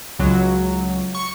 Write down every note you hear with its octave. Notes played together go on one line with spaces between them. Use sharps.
C#2 F#3
C#6